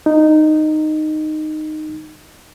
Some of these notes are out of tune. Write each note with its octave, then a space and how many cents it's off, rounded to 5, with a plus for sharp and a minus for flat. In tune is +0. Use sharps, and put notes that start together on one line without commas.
D#4 -10